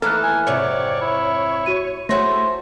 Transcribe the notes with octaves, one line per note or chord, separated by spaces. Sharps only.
D#2 E3 A3 A#3 A4 F6 F#6
G#5
F2 G#2 C3 C#5 D5
E4
F#4 D#7
A3 E4 F#4 G#4 C5 C#5 A#6